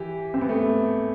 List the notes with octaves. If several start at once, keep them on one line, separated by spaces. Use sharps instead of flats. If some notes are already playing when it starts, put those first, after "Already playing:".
Already playing: E3 G4
C4
B3
A3